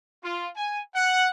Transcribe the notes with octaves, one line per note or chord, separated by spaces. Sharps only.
F4
G#5
F#5